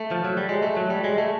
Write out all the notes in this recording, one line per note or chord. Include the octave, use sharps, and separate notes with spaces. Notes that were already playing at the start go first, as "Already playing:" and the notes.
Already playing: A3
F3
F#3
G3
G#3
A3
F#3
G3
G#3
A3